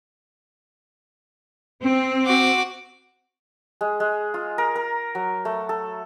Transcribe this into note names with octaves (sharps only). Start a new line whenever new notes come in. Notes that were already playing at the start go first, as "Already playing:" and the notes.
C4
F#4 D6
G#3
G#3
F4
A#4
A#4
F#3
A3
A4